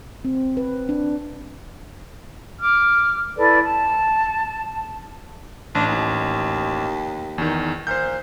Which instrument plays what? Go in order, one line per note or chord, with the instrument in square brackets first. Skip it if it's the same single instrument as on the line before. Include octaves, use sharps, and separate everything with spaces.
[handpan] C4
B4
D4
[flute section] D6 F6
E4 A4 B4 D5
A5
[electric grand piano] A1 [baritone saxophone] D4
[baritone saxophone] D#2
[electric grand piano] E2 D#3
[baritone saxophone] A#2 [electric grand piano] C5 G6